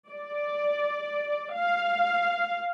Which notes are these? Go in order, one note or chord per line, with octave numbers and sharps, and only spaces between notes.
D5
F5